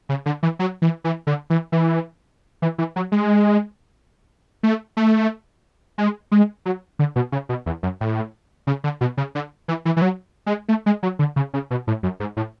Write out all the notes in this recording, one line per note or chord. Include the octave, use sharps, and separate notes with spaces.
C#3
D3
E3
F#3
E3
E3
D3
E3
E3
E3
E3
F#3
G#3
A3
A3
G#3
G#3
F#3
D3
B2
C#3
B2
E2
F#2
A2
C#3
D3
B2
C#3
D3
E3
E3
E3
F#3
G#3
A3
G#3
F#3
D3
C#3
C#3
B2
A2
F#2
G#2
A2